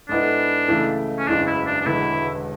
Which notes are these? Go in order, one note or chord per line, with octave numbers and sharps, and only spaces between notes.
G#2 G#3 B3 D4 E4 A4
C#2 C#3 E3 A3
C#4
F#1 E2 C#3 E3 G#3 D4
E4
D4
D4
E1 E2 D3 G#3 B3 E4